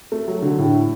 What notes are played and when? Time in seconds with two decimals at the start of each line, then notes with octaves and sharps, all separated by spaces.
0.12 A3
0.28 F#3
0.42 D3
0.58 A2